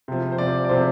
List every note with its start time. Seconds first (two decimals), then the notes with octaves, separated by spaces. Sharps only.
0.08 C3 F3
0.32 C5
0.38 C3 F3 D5
0.65 D5
0.69 C3 F3 C5